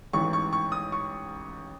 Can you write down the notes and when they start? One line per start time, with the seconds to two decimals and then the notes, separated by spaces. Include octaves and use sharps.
0.13 A1 G#2 E3 C#6
0.33 C#6
0.53 C#6
0.72 D#6
0.92 C#6